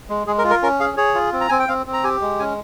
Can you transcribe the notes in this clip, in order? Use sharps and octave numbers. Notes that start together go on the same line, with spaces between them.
G#3
G#3 G#4
A#4
F4
A#4
C#4 A#4
G#4 F5
G#4 C#5
F4
C4
A#5
C4 G#5
G5
C4 F5
C4
A#5
G4 G#5
G#3
C#4 G#5